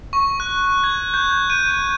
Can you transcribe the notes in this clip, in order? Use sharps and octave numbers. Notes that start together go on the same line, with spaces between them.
C#6
F#6
G#6
G6
D#7
D#7